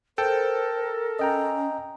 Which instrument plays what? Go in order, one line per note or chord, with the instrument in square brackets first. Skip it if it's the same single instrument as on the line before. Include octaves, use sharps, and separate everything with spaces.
[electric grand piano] A4 [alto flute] A#4 [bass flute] C5 [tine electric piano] G5
[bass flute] C#4 [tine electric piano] D#5 G5 A#5